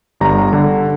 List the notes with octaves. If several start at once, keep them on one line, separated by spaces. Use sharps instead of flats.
G1 G3 A#5
D3